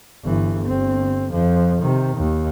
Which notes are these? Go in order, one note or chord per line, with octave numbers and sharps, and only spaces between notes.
G1 E3
G1 C4
F2 F3
C3 D#3
D#2